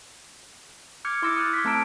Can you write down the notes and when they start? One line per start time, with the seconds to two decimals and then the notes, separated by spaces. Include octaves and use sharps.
1.05 D6 F6 G6 G#6 C#7
1.22 E4 C6 D6 E6 A#6 C#7
1.36 D#6 F6 F#6 A6
1.53 C6 D6 G#6 B6
1.64 A3 C4 A5 A#5 E6 D7